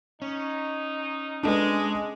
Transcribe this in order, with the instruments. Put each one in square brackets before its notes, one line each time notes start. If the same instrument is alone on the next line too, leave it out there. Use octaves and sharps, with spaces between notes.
[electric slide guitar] C#4 [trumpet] D#4
[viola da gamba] G#3 [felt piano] D4 A4 B4